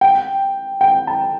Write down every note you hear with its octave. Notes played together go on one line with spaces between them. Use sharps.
G5
G5
A5